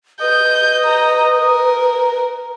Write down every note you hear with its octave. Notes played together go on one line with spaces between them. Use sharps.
B4 D#5 G6
A#5
A#4